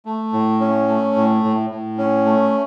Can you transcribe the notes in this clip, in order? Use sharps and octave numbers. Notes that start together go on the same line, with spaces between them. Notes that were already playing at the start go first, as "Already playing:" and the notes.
A3
A2
C#4
A3
A2
A2
A2
C#4
A3